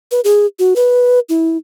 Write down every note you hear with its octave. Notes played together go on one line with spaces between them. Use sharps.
B4
G#4
F#4
B4
E4